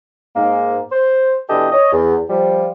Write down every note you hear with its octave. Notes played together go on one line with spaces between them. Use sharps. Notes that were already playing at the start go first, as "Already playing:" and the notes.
G#2 A#3
C5
B2 E3 D4 G4 A4 D#5
C#5 D#5
E2
F3 G3